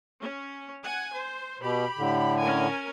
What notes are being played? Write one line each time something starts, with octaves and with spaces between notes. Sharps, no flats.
C#4
F#5 G#5
C5
B2 G4 B5
A2 D3
C#4 A#4 G#5